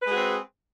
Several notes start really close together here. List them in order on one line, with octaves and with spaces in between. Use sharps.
B4 G#3 G#4 F#4 C4